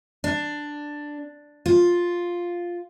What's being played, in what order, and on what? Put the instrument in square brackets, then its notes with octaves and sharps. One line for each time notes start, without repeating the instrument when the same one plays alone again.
[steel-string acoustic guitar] D4
F4